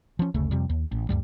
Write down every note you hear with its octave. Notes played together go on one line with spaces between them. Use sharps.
F3 C#4
F#1 D2 C#3 A3
F2 C3 G3
D#2
A1
D2 G2 G3